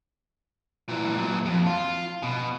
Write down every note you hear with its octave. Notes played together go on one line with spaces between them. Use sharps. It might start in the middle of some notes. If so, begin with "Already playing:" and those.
A#2 E3
A#2 F#3
F2
F4
B2